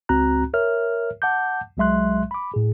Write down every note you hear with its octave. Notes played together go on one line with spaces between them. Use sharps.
C#2 C4 F#4 A#5 F#6
A#4 C#5 E5 F6
F#5 A5 D6 G6
B1 F#3 G#3 E5 C6 F#6
B5 D6
A2 G#4